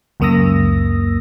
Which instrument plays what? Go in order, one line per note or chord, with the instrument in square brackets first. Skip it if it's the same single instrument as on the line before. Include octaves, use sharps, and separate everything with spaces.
[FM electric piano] C#2 F#2 A#3 D#6 E6 A#6